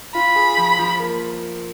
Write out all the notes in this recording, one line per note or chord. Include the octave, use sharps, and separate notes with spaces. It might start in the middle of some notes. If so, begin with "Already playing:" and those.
F4 B5
G#4
F3
F3
A#3